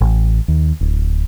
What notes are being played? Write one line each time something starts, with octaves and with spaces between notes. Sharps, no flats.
A1
D#2
D1